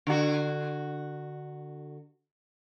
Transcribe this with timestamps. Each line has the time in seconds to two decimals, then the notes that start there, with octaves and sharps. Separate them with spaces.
0.07 D3 F#4